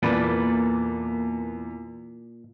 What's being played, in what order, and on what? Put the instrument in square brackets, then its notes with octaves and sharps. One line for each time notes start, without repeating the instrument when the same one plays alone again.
[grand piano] E2 D5 B5 [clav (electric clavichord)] A#2 [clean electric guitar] A#3 A4 B4